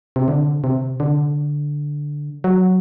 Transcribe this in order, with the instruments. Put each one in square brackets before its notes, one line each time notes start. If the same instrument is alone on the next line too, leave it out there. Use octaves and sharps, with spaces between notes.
[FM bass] C3
D3
C3
D3
F#3